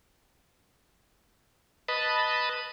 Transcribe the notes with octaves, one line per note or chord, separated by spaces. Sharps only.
B4 D#5 A5 B5